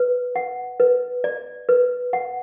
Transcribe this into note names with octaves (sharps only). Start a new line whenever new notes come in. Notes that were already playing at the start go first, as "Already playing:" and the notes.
Already playing: B4
F#5
B4
D5
B4
F#5